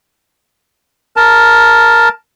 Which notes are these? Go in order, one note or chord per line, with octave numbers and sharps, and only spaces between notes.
A#4 A5